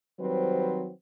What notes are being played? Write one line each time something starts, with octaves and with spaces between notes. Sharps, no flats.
D#3 F#3 G3 C4 B4 C5